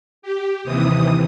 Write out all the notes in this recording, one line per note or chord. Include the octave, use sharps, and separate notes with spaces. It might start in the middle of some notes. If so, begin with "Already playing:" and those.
G4
D#2 C3 E3 D#6